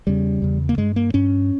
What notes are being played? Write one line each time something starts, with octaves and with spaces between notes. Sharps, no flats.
E2 C#3 G3
E2 C#3
A#3
G2 G#3
A#3
G2 C#4